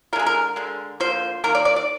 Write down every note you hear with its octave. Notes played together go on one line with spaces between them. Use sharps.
D3 G#3 G#4 A#4
A#4
D3 G#3
D3 F3 A#3 C5
D#3 A#3 A#4
D5
D5
D5